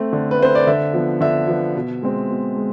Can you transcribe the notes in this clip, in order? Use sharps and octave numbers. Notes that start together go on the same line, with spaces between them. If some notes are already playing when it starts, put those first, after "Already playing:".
Already playing: A3 C4
D3
B4
A3 C4 C5
D5
D3 E5
F3 B3
D3 E5
F3 B3
B2
G#3 C4
B2
G#3